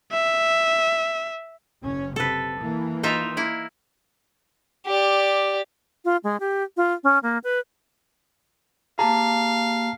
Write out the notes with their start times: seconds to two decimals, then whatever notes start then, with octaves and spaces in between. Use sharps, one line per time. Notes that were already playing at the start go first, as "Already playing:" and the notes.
0.12 E5
1.81 F#1 C#4
2.16 C3 A4 B4
2.60 E3 A#3
3.03 D#4 F4 E5
3.37 A#3 E4
4.87 G4 D5
6.05 F4
6.24 G#3
6.40 G4
6.77 F4
7.04 C#4
7.23 A#3
7.44 B4
8.99 A#3 G4 G#4 F5 A5 A#5